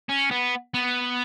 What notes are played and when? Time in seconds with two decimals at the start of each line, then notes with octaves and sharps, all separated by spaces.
0.09 C#4
0.31 B3
0.74 B3